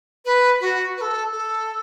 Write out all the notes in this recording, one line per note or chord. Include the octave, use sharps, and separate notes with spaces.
B4
F#4
B4
A4
A4